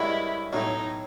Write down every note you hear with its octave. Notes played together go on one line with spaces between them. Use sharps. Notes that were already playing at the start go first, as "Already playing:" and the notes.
Already playing: G2 D#3 G#3 C#4 E4 F#4
B1 A2 F#3 D#4